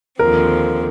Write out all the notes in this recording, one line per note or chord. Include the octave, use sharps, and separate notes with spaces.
D#2 D3 F3 C4 A#4